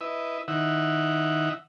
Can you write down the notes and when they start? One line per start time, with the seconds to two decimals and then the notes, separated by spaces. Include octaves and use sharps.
0.01 E4 B4 D#5 E5
0.48 D#3 D#4 E4 E5 F#5